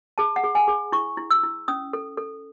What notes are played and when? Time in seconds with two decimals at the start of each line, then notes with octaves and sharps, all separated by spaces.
0.18 G#4 A5
0.36 F#5
0.44 G#4
0.55 G#5
0.68 G#4
0.92 E4 C#6
1.17 E4
1.31 E6
1.43 E4
1.68 C#4 D#6
1.93 A4
2.17 A4